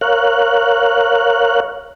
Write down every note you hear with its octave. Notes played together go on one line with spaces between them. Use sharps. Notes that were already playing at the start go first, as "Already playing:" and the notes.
A#4 C#5 F5 F#6